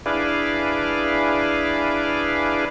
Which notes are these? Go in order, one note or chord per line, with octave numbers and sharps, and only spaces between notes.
D4 E4 G#4 B4 D5 F5